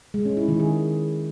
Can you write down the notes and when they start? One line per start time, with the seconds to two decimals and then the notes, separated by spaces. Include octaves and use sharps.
0.14 G#3
0.25 C#4
0.37 E4
0.48 D#3
0.60 G#4